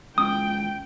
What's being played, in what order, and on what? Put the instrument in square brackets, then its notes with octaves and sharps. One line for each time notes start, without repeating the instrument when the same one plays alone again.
[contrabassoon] C#2 [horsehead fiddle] G5 [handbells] D#6